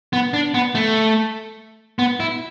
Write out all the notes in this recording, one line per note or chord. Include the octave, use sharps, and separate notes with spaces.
B3
D4
B3
A3
B3
E4